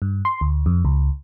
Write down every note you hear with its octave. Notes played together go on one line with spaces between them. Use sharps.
G2
C6
D2
F2
C#2